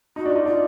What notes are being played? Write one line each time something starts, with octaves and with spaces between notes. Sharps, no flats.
D#4 F#4
D4
F4
D#4
D4 F4